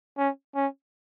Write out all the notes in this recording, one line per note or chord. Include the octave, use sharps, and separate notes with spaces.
C#4
C#4